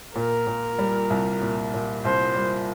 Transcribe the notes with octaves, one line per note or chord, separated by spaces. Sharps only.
A#2 A#4
A#2
G3
C2
A#2
A#2
C2 C5
G3